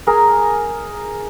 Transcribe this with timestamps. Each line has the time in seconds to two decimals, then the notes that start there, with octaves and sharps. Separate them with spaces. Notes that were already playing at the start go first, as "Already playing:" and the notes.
0.07 G#4 A#4 G#5